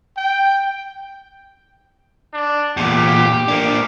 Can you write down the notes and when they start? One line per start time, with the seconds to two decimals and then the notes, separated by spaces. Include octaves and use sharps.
0.17 G5
2.34 D4
2.77 E2 A#2 G4
3.48 A#3 D4